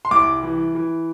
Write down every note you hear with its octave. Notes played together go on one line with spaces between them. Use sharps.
C6
C2 D6
E3
E3